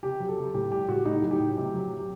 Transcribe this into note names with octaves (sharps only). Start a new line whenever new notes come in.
C3 G4
F#3
A4
C3
A2 G4
G3 G4
A2 F#4
A2 D#4
F#3
G4
A2
C3 G4
F#3
C3
G4